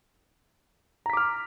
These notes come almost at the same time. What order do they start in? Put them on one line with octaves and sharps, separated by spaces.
A#5 B6 D6 F6